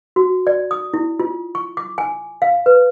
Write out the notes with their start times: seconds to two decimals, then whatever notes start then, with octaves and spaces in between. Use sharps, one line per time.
0.16 F#4
0.47 D5
0.71 D#6
0.94 E4
1.19 F4
1.55 C#6
1.77 D6
1.98 G#5
2.42 F5
2.66 B4